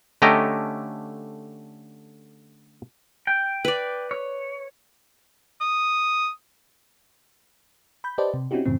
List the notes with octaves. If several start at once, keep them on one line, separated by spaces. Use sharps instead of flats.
D3 A3 C#4 G4 D#5 A#5
G5
B4 D5
C#5
D#6
B5 G6
G4 B4 C5 D5 D#5 A5
C3
C4 C#4 D#4 E4 F#4 G4
F#2 A2 C#3 E3 C4